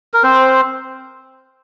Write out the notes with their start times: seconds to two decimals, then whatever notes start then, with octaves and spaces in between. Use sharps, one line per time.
0.14 A#4
0.23 C4 C5